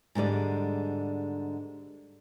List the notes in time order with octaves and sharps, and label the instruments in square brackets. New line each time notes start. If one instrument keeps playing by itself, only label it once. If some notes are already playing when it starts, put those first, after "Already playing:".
[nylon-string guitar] G#2 D3 G3 D5